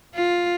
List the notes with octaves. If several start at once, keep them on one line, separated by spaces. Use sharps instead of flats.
F4